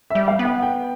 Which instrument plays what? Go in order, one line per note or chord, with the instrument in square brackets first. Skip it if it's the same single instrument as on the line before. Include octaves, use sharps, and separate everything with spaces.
[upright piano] E5
[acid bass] G3
[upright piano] F5
[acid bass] B3
[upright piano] G5
G5